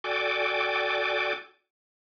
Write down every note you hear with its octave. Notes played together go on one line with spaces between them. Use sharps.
F#4 A4 D5 G5 G#5 D6